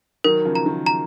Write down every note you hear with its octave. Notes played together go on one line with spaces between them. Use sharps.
D#3 F#3 A#4
C#3 F3
A#5
D#3
A#5